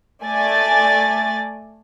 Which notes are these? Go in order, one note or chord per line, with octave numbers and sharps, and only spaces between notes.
A3 D5 G#5 A6